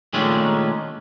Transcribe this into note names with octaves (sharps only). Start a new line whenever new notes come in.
A#2 D#3 G#3 A3 C#4 D4